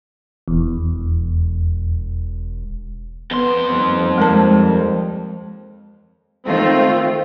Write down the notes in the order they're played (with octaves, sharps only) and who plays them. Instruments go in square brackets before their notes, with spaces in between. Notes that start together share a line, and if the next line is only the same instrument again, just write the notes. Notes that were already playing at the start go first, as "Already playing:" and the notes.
[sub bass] E1 [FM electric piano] E2
[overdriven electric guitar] F2 C6 [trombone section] B3
[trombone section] D#2 G3 C5
[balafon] G#3 A#4 A5
[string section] D#3 A3 C4 F4